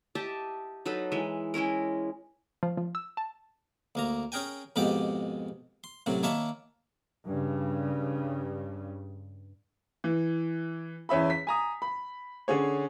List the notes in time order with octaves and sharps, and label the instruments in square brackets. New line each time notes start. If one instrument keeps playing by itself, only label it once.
[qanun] G4 D#5 E5 A5
F#3 D#4 A4 B4
E3 G#3 E5
G#3 C#4 E4 A#4
[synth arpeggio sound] F3
F3
E6
A5
[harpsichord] D2 A#3 A#5
C#4 G#4 A#4 G5 G#5
F2 G#2 B2 G#3 G4 D6
C6
F#2 A2 C3 F#3
D#3 A#3 C#5 E5 A5 B5
[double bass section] G2 C#3
[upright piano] E3
E2 C#4 E5 B5
B6
G#5 A#5 D#6
B5
D3 C#4 G#4 C#5